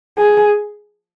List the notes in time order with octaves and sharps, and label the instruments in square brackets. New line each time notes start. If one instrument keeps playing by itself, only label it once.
[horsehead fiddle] G#4